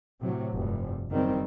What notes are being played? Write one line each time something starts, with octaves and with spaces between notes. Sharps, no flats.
A2 C3 F#3
F1 G2
F#1 D#3 G3 C4